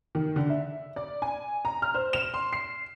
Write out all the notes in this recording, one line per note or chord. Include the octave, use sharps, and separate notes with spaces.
D#3
D3
E5
D5
G#5
A#5
F6
C5
E7
C6
C7